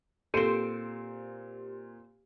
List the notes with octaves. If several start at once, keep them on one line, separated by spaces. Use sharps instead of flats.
A#2 C4 G4 A4 C5 C#7 D#7